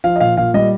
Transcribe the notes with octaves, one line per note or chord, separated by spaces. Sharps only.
F3 F5
D#5
A#2 F5
A#2 F5
G3 D#5